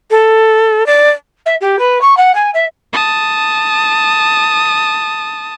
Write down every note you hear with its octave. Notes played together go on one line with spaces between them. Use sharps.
A4
D5
E5
G4
B4
C#6
F#5
G#5
E5
A5 D#6